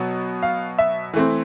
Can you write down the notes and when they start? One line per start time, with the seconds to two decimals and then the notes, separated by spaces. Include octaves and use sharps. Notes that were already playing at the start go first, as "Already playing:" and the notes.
Already playing: B2 F#3 B3
0.43 F5
0.78 E5
1.14 E3 A3 C4